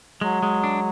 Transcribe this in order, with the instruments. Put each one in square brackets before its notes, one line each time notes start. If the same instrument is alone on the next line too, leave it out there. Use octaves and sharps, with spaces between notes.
[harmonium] F#3 [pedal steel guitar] G#3
[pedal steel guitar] G#3
D4